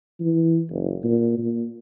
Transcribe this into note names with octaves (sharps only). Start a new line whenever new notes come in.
E3
F#1
A#2
A#2